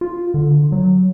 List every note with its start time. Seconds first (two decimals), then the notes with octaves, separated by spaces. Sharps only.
0.01 F4
0.34 D3
0.72 F#3